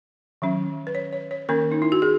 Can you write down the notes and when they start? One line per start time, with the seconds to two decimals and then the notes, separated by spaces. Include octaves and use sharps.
0.42 D#3 F#3 C#4
0.87 B4
0.95 C#5
1.13 C#5
1.31 C#5
1.49 D#3 A#3 C#4 A#4
1.72 D#4
1.82 E4
1.92 F#4
2.02 G#4